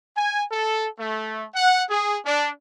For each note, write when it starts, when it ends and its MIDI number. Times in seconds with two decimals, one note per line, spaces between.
0.17 0.42 80
0.51 0.87 69
0.99 1.44 57
1.55 1.83 78
1.90 2.16 68
2.26 2.50 62